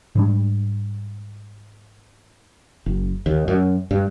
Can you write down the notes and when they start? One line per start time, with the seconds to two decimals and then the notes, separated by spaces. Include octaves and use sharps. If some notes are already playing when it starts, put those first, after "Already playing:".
0.15 G#2 G3 D4
2.86 F#1
3.26 D#2
3.48 F#2
3.91 G2